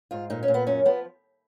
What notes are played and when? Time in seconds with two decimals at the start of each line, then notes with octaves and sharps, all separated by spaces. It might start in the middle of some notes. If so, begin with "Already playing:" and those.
0.11 G#2 F4
0.30 A#2 D#4
0.43 C#4
0.48 A#2
0.54 B3
0.67 F#2 C#4
0.85 F3 B3